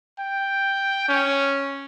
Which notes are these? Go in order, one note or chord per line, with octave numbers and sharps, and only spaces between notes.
G5
C#4